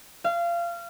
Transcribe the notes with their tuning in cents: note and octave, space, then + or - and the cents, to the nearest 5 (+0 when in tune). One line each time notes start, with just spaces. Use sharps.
F5 -25